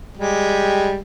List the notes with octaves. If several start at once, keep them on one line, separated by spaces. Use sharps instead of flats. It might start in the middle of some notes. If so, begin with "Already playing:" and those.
G3 G#3 G4